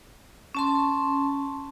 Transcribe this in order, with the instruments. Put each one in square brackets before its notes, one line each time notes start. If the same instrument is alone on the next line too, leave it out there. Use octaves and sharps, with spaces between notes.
[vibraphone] C#4 A5 C6